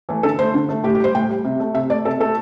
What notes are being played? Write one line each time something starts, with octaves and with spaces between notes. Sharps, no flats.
E3 A3
D3 A4
A3 C5
D3
A3
A2 G4
G4
G3 C5
A2 G5
G3
C3
A3
C3 E5
A3 D5
C3 A4
A3 A4